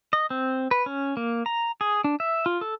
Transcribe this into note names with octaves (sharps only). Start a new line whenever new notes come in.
D#5
C4
B4
C#4
A#3
A#5
G#4
D4
E5
F4
A4